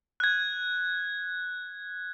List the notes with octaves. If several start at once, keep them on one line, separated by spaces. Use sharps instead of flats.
F#6 G#6